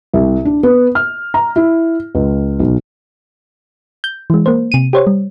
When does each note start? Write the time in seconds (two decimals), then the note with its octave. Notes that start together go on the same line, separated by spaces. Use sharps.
0.14 C2
0.45 D4
0.63 B3
0.95 F6
1.34 A#5
1.56 E4
2.15 C#2
2.59 B1
4.04 G6
4.30 E3 G#3
4.46 A#3 C5
4.72 C3 D#7
4.93 G4 C5 C#5
5.07 G3